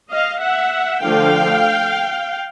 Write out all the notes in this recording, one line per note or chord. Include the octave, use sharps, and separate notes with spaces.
D#5 F5
E5 F#5
D3 F3 A3 F5 G5